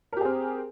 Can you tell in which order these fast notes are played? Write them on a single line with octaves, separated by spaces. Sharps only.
A#4 G4 G#4 C4